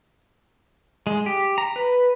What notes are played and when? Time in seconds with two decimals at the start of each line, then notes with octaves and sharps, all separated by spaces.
1.07 G#3
1.26 G4
1.58 A#5
1.76 B4